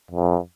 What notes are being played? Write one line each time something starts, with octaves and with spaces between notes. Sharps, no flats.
F2